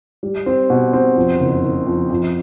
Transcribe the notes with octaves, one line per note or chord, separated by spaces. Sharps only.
G3
C4
B2
C4
F2
F#1
F#1
F2
F2